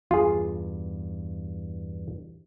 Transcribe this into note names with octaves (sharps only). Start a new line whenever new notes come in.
E2 G2 F4 G#4